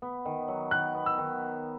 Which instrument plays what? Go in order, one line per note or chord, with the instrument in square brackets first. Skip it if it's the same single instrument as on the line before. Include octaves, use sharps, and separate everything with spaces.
[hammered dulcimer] B3
D#3
F#3
[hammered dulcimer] D#3 [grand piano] F#6
[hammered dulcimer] B3
[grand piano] E6
[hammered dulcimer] D#3